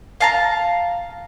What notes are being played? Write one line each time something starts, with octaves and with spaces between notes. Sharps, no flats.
F5 A5 A#5